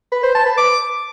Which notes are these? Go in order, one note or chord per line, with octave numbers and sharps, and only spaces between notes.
B4
C5
A5
B4
D6